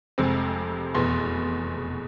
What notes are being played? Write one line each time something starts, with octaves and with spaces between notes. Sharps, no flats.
F1 F2 C3 G#3 C4
F1 E2 B2 B3 C6